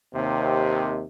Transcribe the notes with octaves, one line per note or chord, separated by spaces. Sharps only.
D#2 C3